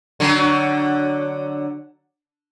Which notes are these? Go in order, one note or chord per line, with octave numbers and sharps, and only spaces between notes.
D3 F#3